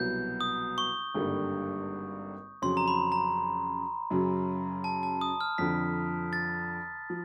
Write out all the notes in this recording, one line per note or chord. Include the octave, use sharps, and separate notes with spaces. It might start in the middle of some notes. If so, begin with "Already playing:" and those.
Already playing: C2 B2 F#3 B3 G6
D#6
C#6
G#1 G2 D3 G3 A#3
F2 C#3 F#3 C6
A#5
B5
A#5
F#2 C#3 F#3
A5
A5
D#6
F6
F2 D3 F3 B6
A6
F3